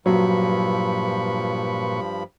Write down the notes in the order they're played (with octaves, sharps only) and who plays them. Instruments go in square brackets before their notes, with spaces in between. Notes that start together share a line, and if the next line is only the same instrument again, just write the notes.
[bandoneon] G2 F3 B5 [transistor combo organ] A#2 B4 C#6 [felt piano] F#3